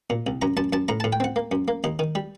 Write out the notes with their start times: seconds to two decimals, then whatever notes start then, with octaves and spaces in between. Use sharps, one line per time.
0.10 A#2
0.27 C2
0.42 F#2 A#5
0.57 F#2 A5
0.73 F#2 A5
0.88 A2 A#5
1.00 A2 A5
1.13 G5
1.20 C4 F#5
1.36 A#3
1.52 F#2
1.68 A#3
1.84 D#2 D#5
1.99 D#3
2.15 G3